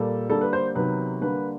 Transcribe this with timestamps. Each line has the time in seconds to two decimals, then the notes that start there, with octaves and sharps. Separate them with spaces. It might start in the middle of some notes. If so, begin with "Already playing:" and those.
Already playing: A#2 G3 A#3 A4
0.29 D3 G3 A#3 A4
0.41 B4
0.53 C5
0.75 C3 D#3 F#3 B3 B4
1.21 D3 G3 A#3 B4